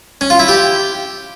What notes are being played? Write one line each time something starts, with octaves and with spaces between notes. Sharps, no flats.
C#4
F4
E4
G4